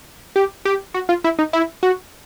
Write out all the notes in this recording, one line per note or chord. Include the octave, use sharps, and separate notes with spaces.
G4
G4
F#4
F4
E4
D#4
E4
F#4